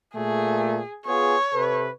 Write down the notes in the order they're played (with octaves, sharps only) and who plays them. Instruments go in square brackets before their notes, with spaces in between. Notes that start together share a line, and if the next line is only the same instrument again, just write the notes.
[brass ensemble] A#2 A3 [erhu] G#4
[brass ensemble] B3 F4 G#4 [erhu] C#5
[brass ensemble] C3 A4 B4